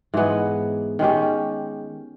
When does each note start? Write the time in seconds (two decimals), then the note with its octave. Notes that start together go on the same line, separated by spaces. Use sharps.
0.14 G#2 E3 G#3 B3
0.99 D#3 G#3 C#4 G4